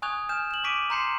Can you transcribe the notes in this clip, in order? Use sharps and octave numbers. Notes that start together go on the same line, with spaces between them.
G#5 C#6 D#6 F#6 G#6 F7
G#5 F6 G6 E7
E7 F#7
C#6 D6 B6 D7 D#7
A#5 C6 G6 C7 C#7 E7